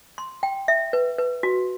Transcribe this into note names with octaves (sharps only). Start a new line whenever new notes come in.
C6
G5
E5
B4
B4
F#4